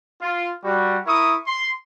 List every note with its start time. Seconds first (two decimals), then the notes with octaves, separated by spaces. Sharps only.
0.22 F4
0.64 G3 F#4
1.05 E4 A#4 C#6 D#6
1.47 C6